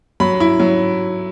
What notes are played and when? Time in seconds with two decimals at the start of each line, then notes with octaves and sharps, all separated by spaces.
0.20 F#3 B5
0.40 E4
0.60 F#3